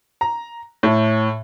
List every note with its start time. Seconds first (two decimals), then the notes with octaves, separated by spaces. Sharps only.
0.21 A#5
0.83 A2